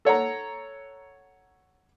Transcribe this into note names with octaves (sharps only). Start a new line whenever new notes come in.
A4 C#5 F#5 A#5